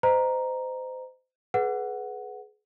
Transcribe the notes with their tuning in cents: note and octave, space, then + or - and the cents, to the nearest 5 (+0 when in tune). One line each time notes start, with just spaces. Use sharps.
C5 -30 D#5 -20 A#5 +0
G#4 +30 B4 +0 F#5 +0